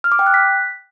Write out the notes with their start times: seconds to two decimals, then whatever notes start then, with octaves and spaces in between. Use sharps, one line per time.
0.04 F6
0.12 D6
0.19 G5
0.27 F#6
0.34 B6